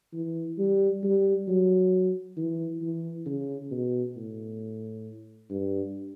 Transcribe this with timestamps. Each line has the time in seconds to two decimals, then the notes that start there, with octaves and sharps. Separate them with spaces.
0.13 E3
0.58 G3
1.03 G3
1.48 F#3
2.37 E3
2.82 E3
3.26 C#3
3.71 B2
4.16 A2
5.50 G2